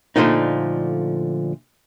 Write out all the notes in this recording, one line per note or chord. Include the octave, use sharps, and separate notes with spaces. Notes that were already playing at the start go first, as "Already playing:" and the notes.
A#2 D3 F3 A3 D#4